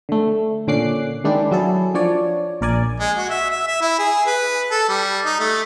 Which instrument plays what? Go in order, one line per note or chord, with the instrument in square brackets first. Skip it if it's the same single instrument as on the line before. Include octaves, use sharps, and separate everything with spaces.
[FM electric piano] D3 A3
A#2 D3 C#4 D6 F#6 C7
D#3 G#3 D4 E4 G4
F#3 E4 G#4 A4
F3 D4 C#5 D5
A#1 A#4 D5 G#5
[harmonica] G#3
F#4
E5
E5
E5
E4
G#4
B4
A4
G3
D#4
A3